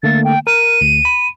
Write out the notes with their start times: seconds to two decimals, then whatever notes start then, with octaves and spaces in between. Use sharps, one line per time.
0.03 D3 A3 A#3 A6
0.24 G5
0.47 A#4 F6 D#7
0.81 D2
1.05 B5